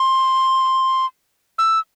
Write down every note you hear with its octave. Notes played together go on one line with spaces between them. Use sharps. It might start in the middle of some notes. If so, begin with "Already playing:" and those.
Already playing: C6
E6